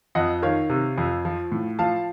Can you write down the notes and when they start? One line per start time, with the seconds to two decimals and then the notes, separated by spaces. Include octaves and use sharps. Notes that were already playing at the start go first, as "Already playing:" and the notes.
0.15 F2 D#5 F#5
0.42 D#3 C#5 F5
0.70 C3
0.98 F2
1.25 F3
1.52 A2
1.79 F3 F5 A5